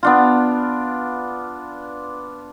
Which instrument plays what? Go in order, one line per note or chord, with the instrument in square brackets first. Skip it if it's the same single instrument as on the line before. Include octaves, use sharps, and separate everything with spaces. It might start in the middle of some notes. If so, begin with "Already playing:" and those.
[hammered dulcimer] B3 D4 F4